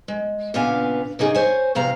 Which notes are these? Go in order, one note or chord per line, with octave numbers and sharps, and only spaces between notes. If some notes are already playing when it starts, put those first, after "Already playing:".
G#3
A#2 C#3 B3 D4 F5 G#5
C#3 A#3 D#4 G#4
C5 C#5 G#5
E2 C3 F5 A#5